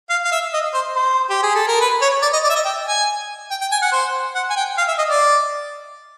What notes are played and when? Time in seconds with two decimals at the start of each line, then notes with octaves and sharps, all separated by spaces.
0.10 F5
0.25 F5
0.32 E5
0.54 D#5
0.74 C5
0.95 C5
1.30 G4
1.43 G#4
1.55 A4
1.67 A#4
1.81 B4
2.01 C#5
2.23 D5
2.33 D#5
2.45 D5
2.50 E5
2.55 D#5
2.65 G5
2.87 G#5
3.51 G5
3.61 G5
3.72 G#5
3.82 F#5
3.92 C5
4.35 F#5
4.50 G#5
4.56 G5
4.78 F5
4.88 E5
4.98 D#5
5.09 D5